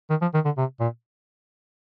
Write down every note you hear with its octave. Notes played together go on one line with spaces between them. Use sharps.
D#3
F3
D#3
D3
C3
A#2